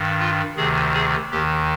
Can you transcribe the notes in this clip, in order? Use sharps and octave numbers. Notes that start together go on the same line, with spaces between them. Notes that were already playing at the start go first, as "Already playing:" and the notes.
Already playing: G2 D#3
F4
D2 C3 D#3 G#4
G#4
D#2 D#3 G4